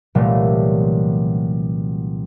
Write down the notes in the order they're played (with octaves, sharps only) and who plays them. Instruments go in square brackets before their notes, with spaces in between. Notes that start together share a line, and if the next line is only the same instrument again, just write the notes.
[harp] C2 A#2 E3 F#3 G3 A3